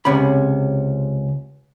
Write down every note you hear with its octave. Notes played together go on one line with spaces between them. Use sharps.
C#2 C3 C#4 B5